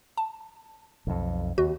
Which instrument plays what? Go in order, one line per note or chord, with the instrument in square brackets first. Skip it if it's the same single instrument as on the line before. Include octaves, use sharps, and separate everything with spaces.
[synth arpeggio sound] A5
[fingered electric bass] B1 F2
[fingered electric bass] D#2 [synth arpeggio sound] F#4